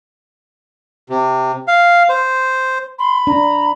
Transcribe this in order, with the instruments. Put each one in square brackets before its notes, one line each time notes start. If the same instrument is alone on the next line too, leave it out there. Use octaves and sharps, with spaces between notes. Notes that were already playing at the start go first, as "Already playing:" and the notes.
[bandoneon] C3
F5
C5
[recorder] B5 [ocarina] C6
[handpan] D4 [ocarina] A#5